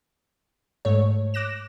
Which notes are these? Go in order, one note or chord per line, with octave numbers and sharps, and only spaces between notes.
G#2 A3 C#5
D6 F#6 A#6 E7